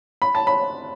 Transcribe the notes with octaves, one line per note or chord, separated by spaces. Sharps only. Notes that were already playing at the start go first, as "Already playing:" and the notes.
B5
A5
B5